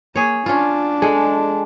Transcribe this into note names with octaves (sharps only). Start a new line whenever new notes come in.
A#3 G#4 C#5
C#4 D4 F4
G#3 G#4 A4